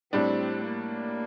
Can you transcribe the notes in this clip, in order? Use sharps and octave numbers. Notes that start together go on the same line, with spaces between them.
A2 G3 C4 D4
A#3